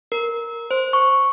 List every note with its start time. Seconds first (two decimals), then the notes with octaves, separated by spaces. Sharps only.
0.12 A#4
0.71 C5
0.93 C#6